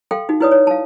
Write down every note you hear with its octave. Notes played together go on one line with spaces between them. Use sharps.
A4 F5 G5 C6
D#4 F#4
E4 F#4 B4 C#5 D5 D#6
C#5
F5 A5